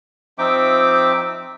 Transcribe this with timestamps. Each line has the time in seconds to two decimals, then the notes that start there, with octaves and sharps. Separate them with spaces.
0.38 F3 C4 D#4 E5 G5 D6